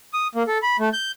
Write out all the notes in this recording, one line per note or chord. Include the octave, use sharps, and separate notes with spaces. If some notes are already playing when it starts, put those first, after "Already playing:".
D#6
A#3
A4
B5
A3
G6